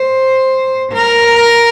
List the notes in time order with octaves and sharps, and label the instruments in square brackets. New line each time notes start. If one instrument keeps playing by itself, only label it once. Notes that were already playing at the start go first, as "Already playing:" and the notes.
Already playing: [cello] C5
A#4